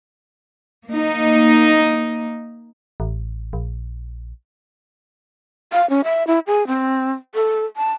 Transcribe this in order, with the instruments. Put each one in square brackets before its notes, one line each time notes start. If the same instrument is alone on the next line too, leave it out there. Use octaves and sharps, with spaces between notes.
[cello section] A#3 D#4
[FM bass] A1
A#1
[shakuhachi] F5
C#4
E5
E4
G#4
C4
A4
A5